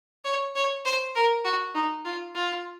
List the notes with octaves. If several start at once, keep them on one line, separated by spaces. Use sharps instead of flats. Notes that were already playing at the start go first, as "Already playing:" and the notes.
C#5
C#5
C5
A#4
F#4
D#4
F4
F4